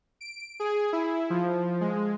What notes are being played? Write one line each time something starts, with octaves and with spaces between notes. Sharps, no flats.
D7
G#4
E4
F3
G#3